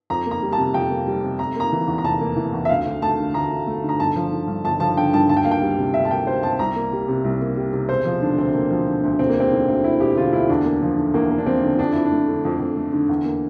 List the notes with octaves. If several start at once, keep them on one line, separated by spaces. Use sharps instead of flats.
F2 A#5
A#3
A#5
G3
A5
C3
F2 G5
A#3
G3
C3
F1 A#5
A#3 A#5
E3
E2
A#5
F1 A5
A#3
E3
E2
E5
D2 F5
D2
A3 A5
D3
D2 A#5
D2
A3
D3
A#5
G1 A5
F3
D3
G2
G1 A5
F3 A5
D3 G5
G2 A5
D2 A5
G5
A#3 F5
G5
G3
C3
D2 E5
A5
A#3 G5
G3 C5
C3 A5
C2 A#5
A#3
G3
C3
C2
A#3
G3
C3
E1 C5
F3
D3 D4
D2 C4
E1 A#3
F3
D3
D2
E1 C4
A#3
E1 C4
D3
D2
E1 E4
E1 G4
D3 F4
D2 E4
E2 D4
A#3
F3
D3
E2 A#3
A#3
D4
F3 C4
D3
F2 D4
F2 E4
D4
A3
D3
F2
F2
A3
D3
E2
A#3